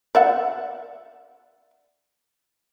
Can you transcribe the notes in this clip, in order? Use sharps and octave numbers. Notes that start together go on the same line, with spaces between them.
D5 E5 F#5